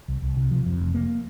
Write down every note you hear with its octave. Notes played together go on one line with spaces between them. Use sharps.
C2
C2
C3
F3
F2
F1
A#3